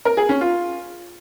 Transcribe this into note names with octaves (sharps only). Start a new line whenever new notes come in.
A#4
G#4
C#4
F4